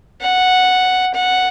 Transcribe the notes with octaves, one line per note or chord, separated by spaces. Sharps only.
F#5
F#5